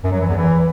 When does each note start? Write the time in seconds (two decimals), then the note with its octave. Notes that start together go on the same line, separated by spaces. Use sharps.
0.03 F#2
0.12 F#3
0.20 E3
0.29 E2
0.37 E3